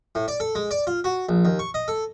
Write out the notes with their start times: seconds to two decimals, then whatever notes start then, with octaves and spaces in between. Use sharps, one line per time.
0.15 A2
0.28 D5
0.40 A4
0.55 G#3
0.71 D5
0.87 F4
1.04 F#4
1.29 A#1
1.45 D#2
1.59 C#6
1.74 D#5
1.88 A4